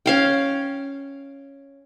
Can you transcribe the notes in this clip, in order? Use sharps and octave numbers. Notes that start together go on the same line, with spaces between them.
C#4 F5 G5